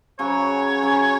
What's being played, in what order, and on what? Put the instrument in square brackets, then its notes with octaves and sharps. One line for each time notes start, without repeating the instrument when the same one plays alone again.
[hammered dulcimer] C#3 F#3 C#4 F#4 [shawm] C#5
[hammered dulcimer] C#3 F#3 C#4 F#4